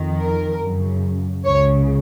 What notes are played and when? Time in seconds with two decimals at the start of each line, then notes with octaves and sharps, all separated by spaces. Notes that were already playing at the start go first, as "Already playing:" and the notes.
Already playing: F2 D#3
0.18 A#4
0.60 F#2 C#3
1.44 C#2 C#3 C#5